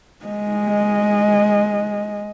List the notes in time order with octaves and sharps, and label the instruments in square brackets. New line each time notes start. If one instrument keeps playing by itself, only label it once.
[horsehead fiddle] G#3 D#5